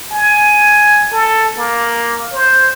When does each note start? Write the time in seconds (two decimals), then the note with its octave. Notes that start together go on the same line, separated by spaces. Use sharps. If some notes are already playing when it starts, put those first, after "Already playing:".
0.13 G#5
1.13 A4
1.57 A#3
2.33 C5